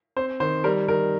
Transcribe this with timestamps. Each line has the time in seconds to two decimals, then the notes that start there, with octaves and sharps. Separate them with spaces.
0.17 C4 C5
0.40 D#3 C5
0.64 G3 A#4
0.88 D#3 A#4